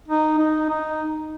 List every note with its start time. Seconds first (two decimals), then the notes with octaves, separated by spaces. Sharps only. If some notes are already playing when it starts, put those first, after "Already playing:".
0.08 D#4
0.38 D#4
0.69 D#4